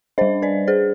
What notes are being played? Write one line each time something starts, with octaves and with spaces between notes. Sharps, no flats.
G3 D4 C5 D#5
B4 D5
G#4 C5